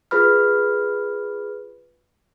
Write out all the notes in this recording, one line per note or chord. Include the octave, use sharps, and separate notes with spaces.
F4 G#4 B4 B5 F6